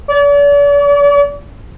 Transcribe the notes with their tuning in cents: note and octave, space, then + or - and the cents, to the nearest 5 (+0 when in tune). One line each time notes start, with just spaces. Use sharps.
D5 -40